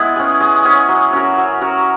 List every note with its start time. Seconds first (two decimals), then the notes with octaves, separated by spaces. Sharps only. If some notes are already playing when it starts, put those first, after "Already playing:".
Already playing: G#3 B3 E4
0.16 C#4 G#4
0.40 G#3
0.65 C#4 G#4
0.88 F#3
1.13 C#4 F#4 A#4
1.38 F#3
1.61 C#4 F#4 A#4